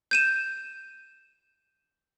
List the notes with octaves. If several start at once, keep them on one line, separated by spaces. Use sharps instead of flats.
G6 D#7 E7